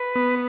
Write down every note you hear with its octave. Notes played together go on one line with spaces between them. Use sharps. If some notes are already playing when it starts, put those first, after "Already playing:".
Already playing: B4
B3